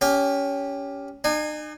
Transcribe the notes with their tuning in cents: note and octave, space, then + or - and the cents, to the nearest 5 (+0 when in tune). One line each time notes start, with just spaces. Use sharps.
C#4 +20 G4 +0 G#5 -45
D#4 -45 G#5 -10